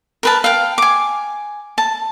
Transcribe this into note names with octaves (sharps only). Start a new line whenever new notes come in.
A#4 B4 A5
F5 G5
G#5 D6
A5